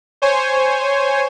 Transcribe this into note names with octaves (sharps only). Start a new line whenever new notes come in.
C5 C#5 G#5